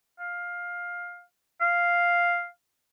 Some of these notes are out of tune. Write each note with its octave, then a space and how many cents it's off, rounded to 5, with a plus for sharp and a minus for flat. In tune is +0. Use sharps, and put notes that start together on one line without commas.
F5 +15
F5 +0